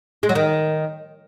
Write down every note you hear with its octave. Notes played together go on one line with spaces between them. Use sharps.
G#3
F#3
D#3